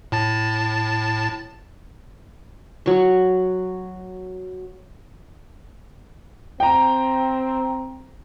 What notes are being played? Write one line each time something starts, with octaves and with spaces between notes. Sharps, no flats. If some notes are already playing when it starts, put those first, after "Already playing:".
A2 A5 A6
F#3 C#6
C4 G5 A#5